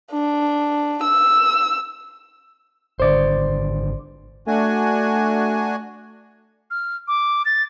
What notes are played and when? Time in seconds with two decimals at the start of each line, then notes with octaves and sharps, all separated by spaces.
0.12 D4
1.03 E6
3.00 G#1 D3 C5 D5
4.47 A3 D4 F#4 G#5
6.71 F6
7.08 D6
7.46 A6